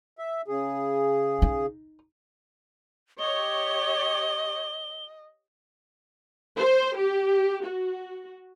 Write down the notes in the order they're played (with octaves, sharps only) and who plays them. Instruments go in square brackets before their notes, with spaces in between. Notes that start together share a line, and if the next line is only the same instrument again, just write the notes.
[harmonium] E5
C#3 G#4
[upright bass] D#4
[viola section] G4 C#5 [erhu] D#5 [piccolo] G7
[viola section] C5
G4
F#4